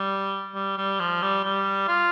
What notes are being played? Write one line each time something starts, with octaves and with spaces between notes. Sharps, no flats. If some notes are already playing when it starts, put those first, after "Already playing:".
Already playing: G3
G3
G3
F3
G3
G3
F4